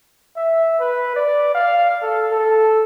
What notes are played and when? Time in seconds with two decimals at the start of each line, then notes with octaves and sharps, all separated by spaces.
0.36 E5
0.80 B4
1.16 D5
1.55 F5
2.02 A4
2.31 A4